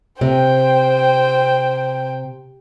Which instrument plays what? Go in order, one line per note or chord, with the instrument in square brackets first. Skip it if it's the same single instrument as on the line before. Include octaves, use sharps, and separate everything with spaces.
[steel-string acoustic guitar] C3 [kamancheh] C5 G5